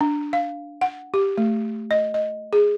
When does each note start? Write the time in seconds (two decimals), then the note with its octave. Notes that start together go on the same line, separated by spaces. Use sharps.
0.01 D4
0.33 F5
0.81 F#5
1.14 G4
1.38 A3
1.91 D#5
2.14 D#5
2.53 G#4